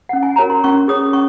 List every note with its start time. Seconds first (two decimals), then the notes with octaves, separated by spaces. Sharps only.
0.09 C#4 F#5
0.23 G#5
0.36 F#4 A#4 C#5 A#5
0.50 C6
0.64 C#4 C#6
0.88 G#4 C#5 D#6
1.13 C#4 C#6